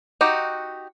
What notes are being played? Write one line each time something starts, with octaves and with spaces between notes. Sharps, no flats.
D#4 F#4 G4